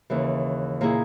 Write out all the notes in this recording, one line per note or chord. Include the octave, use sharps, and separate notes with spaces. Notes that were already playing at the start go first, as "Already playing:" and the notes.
D#2 C#3 E3
A#2 A#3 E4 G#4